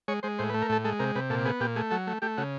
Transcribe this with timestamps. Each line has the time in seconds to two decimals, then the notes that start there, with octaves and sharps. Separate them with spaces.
0.08 G#3 C#5
0.23 G#3 C5
0.39 A2 C5
0.50 B4
0.54 A3
0.62 A#4
0.69 A2 A4
0.84 G#3 A4
0.99 C3 A#4
1.15 C3 B4
1.30 A#2 A4
1.45 B3 G#4
1.60 A#2 G4
1.76 A3 G#4
1.91 F#3 A4
2.07 A3
2.22 A3 G4
2.37 C#3 F#4